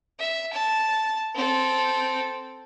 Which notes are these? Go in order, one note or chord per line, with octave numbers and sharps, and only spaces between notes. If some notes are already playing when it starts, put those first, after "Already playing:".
E5
A5
C4 A4